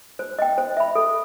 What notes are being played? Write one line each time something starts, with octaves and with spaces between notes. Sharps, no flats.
C5
D#5 G5
C5
E5 B5
A4